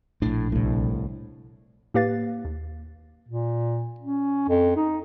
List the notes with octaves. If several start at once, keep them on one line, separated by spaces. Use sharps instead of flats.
A#1 A2 D4
C2 A2
A2 A#3 G4 B4 F5 A6
D#2
A#2
C#4
F2
D#4